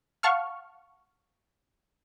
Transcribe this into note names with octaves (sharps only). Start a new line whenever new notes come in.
F5 F#5 A5 C#6 F6